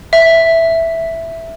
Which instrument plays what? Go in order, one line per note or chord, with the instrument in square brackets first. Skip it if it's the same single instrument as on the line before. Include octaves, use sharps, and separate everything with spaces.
[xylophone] E5